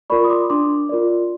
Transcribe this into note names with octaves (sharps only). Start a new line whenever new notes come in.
F4 A#4 D5 B5 C#6
D#6
C6 D6
D4 C6 D6
F4 A#4 D5